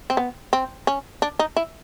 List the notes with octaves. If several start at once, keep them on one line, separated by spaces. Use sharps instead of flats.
C4
B3
C4
C#4
D4
D#4
E4